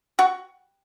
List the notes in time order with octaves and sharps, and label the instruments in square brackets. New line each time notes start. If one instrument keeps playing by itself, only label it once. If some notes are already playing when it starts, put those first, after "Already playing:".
[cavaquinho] F#4